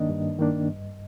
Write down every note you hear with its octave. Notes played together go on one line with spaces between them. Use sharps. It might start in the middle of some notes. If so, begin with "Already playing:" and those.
Already playing: G2 D#3 A#3 D4 D#5
G2
D#3 A#3 D4
G2